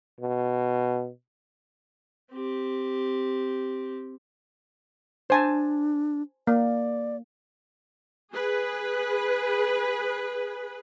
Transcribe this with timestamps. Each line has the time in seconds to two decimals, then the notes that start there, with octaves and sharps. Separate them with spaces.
0.20 B2
2.32 C4 G4
5.30 D4 C5 G#5 A5
6.47 A#3 D5
8.32 G#4 B4